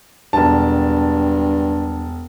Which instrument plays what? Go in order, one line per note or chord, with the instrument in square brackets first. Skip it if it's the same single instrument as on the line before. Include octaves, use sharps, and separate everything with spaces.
[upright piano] E1 A5 [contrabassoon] G2